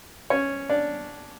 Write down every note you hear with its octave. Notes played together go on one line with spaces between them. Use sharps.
C#4 C#5
D4 D5